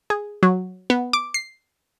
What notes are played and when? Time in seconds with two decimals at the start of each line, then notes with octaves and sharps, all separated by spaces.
0.10 G#4
0.43 F#3
0.90 B3
1.13 D6
1.34 C7